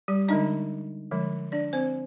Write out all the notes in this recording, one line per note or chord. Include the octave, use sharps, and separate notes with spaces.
G3 G4
D3 G#3 D4 D#4 D#5
D3 F3 G#3
D4 D5
C4 C5